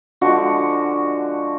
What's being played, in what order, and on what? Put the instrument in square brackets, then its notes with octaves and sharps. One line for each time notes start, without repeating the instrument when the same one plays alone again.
[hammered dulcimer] D3 F3 G#3 [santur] F#4